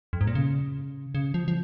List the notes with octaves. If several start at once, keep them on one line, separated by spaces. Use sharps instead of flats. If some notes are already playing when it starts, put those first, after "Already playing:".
F2
G#2
A#2
C#3
C#3
F3
F3